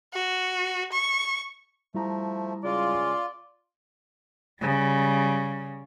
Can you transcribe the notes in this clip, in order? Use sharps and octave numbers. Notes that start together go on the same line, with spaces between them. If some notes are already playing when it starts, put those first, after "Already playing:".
F#4
C#6
F3 G3 A3 E4 A#5
C#3 G#3 F4 D5
C#3 G3